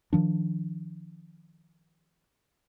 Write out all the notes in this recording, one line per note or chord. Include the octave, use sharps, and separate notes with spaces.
D#3 F3 D4